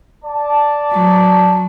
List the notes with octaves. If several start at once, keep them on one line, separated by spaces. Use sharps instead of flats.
D5 A5
F#3